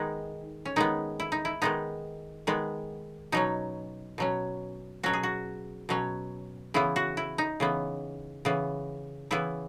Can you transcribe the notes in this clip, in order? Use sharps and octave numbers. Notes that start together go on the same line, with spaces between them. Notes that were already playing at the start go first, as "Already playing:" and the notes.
Already playing: D#3 G#3 B3 D#4
C#4
D#3 G#3 B3 D#4
E4
D#4
E4
D#3 G#3 B3 D#4
D#3 G#3 B3
B2 F#3 C#4 D#4
B2 F#3 C#4
B2 F#3 C#4 F#4
G#4
F#4
B2 F#3 C#4
C#3 E3 B3 E4
F#4
E4
D#4
C#3 E3 B3
C#3 E3 B3
C#3 E3 B3 E4